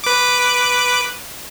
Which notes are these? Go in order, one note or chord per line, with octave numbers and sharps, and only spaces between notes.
B4 D6